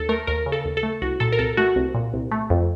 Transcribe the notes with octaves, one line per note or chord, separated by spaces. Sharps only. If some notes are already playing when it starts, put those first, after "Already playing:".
Already playing: D#2 A4
A3 A#4
D#2 A#4
C#3
A4
D#2
A4
A3
C2 F#4
A#2 A4
A#4
C2 A4
A3 F#4
C2
A#2
C2
A3
F2